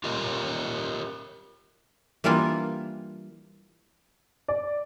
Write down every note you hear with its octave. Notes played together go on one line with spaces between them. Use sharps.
F4 G4 A#4 D#5
E3 G3 A#3 D4 F4
D5